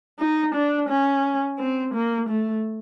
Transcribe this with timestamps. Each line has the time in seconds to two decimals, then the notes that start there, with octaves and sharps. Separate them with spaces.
0.19 D#4
0.54 D4
0.89 C#4
1.58 C4
1.94 A#3
2.28 A3